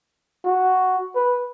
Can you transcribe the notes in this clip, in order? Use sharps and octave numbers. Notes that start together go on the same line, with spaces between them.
F#4
B4